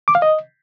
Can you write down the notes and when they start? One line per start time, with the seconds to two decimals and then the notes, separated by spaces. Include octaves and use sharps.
0.08 D6
0.15 F5
0.22 D#5